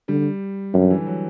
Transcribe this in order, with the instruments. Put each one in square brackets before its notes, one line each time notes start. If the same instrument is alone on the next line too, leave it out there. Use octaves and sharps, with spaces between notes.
[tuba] D3 [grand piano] G3
[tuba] F#2 [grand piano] D3
[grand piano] E3
F#3